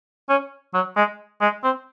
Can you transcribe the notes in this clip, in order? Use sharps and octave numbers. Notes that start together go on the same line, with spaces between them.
C#4
F#3
G#3
G#3
C4